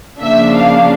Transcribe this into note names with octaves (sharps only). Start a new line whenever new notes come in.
C#3 F3 A#3 D4 E5
F5